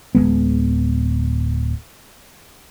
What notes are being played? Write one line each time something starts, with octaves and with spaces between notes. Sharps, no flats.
D1 D2 G#3 B3